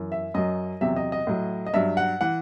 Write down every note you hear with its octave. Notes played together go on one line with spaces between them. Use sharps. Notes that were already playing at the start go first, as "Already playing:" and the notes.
Already playing: F#2 E3
E5
F#2 F#3 D#5
E2 C3 F#3 E5
D#5
D#5
A2 F#3
D#5
G2 F#3 E5
F#5
E3 F#5